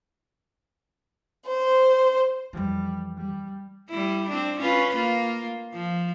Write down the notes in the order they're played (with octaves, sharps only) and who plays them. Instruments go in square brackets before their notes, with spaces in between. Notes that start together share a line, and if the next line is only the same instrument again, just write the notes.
[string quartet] C5
[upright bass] F2 E3 [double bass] G3
[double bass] G3
[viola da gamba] G3 E4
C4 D4
C#4 F4 B4
A#3 F4
F3